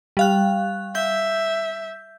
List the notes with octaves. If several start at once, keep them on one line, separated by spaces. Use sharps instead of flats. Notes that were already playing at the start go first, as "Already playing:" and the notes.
G3 F5 F#6
E5 G6